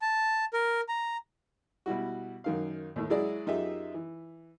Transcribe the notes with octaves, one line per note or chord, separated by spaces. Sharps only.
A5
A#4
A#5
B2 G3 E4 F#4
F#2 D#3 F5
D#2 A2
F#3 G#3 E4 G#4 D5
F#2 D#4 F4 G4 G#4 E5
E3